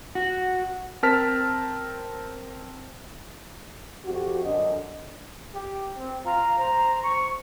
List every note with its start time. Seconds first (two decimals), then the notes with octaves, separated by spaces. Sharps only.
0.15 F#4
1.03 C4 A#4 A5 F6 B6
4.05 F2 F#4 G4
4.44 F#2 D3 D#5
5.54 G4
5.96 C4
6.25 F4 A#5
6.58 C5 A#5
7.03 C#6